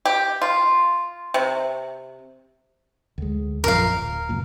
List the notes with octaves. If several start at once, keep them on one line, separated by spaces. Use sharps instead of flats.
G4
F4
C3
D2 G#3
A#1 F#2 F3 A#4 F5
D1
C#2 F#2 A#2